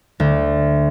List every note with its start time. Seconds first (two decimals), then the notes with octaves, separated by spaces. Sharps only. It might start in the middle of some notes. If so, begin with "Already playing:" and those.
0.20 D2